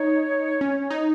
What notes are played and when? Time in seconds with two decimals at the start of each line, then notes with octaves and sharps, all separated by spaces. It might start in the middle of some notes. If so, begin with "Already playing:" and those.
Already playing: D#4 C#5
0.61 C#4
0.91 D#4